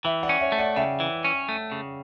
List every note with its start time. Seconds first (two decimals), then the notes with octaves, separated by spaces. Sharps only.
0.04 E3 E5 G5
0.23 D5 F#5
0.29 C#4
0.40 C#5 E5
0.52 A3
0.58 D5 F#5
0.76 C#3 E5 G5
1.00 E3
1.25 C#4
1.49 A3
1.72 C#3